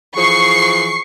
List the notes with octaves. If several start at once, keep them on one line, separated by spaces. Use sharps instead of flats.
E3 F3 G#4 C#6 C7